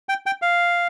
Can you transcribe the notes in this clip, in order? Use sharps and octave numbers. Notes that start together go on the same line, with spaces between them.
G5
G5
F5